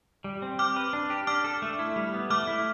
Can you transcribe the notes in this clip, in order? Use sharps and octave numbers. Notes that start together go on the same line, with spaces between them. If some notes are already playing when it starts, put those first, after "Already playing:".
G3
C4
G4 D6 F6
B4
D4
G4
D4 D6 F6
A4
A3
E4
G3
B3
A3 D6 F6
E4